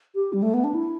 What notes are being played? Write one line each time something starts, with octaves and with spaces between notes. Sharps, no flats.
G4
G3
A3
B3
D4
E4